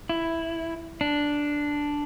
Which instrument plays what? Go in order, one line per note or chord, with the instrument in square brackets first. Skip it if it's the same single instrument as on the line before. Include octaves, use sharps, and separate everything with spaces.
[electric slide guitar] E4
D4